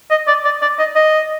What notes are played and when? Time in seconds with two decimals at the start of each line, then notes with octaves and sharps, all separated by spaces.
0.10 D#5
0.27 D5
0.45 D5
0.62 D5
0.79 D#5
0.96 D#5